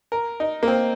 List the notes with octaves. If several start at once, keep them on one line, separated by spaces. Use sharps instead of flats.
A#4
D#4
A#3
C4